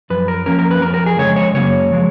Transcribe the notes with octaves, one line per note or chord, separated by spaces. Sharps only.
F#2 F3 B4
A#4
F2 F3 A#3 C#4 A#4
A#4
B4
F2 F3 A#4
A#4
G#4
F2 C#3 G#3 C#5
C#5
F#2 C#3 F#3 A#3 C#5
F3 G#3